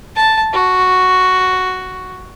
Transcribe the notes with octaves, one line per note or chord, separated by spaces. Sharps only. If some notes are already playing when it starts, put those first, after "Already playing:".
A5
F#4